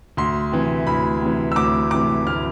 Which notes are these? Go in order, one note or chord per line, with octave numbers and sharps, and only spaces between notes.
D2 C6
C3 E3
D2 B5
C3 E3
E6
D2 D6
C3 E3 D6
D2 F6